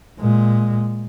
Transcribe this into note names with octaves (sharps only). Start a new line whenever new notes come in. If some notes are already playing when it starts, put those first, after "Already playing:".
A#2 G#3